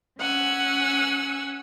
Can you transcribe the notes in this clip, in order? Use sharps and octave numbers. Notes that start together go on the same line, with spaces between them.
C#4 F#5 G#5 E6